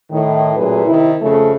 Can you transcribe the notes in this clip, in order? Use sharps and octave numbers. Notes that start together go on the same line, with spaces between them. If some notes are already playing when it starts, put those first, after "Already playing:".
A2 D#3
F#2 A#2 A3 G#4 B4
C3 D#3 E4
F2 C#3 A3